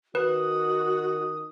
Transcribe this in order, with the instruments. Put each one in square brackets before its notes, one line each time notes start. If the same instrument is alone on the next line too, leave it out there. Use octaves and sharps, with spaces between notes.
[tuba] D#3 [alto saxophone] F#4 [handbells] B4 [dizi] D#6